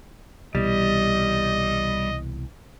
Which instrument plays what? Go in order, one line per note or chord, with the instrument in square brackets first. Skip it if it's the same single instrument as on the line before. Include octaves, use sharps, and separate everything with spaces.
[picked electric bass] C2 B2 E3 [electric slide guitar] G3 [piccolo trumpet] D#5